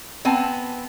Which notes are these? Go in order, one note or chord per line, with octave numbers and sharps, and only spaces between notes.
B3 C4 G#5 A5